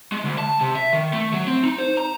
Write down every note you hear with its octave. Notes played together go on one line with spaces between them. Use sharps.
G#3
D2
A5
C3
E5
D#3
A3
F#3
C4
D#4
C5
A#5